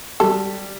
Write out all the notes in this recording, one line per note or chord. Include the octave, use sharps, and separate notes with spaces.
G3 A4